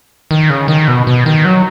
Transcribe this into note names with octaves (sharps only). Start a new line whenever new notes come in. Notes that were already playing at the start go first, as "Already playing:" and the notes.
D#3
C#3
D#3
B2
B2
D#3
F#3